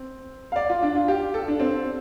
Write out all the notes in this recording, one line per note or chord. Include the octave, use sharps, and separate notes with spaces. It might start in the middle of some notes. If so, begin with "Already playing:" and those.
Already playing: C4
F5
D5
F4
D4
F4
G4
A4
D4
C4